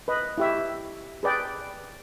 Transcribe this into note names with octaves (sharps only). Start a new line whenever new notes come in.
B4 D#5
E4 G4 E5
G#4 B4 D5 G5